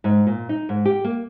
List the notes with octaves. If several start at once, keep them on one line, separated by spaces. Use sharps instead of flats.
G#2
A#2
D#4
G#2
G4
A#3